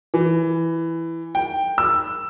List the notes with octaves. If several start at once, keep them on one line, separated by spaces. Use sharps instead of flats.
E3
G5
E6